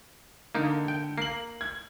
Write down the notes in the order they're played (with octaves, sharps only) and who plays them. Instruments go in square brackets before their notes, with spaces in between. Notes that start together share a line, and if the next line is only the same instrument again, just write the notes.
[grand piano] D3 [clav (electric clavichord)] A#3 D#4
[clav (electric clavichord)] G5
[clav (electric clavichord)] A#3 [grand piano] C7 F#7
[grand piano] G#6